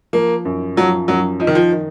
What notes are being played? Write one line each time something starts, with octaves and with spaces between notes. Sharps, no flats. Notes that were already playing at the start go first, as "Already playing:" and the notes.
F3 A#3
F#2
F3 F#3
F#2 F#3
F3 D#4
D#3
F3
D#3